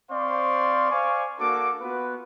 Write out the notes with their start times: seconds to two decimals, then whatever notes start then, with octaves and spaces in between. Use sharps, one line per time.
0.11 C4 C5 D5 F5 C6 C#6
0.91 C5 D5 F5 G#5 C#6
1.40 A#3 D4 F#4 A4 D6
1.81 B3 F4 F#4 B4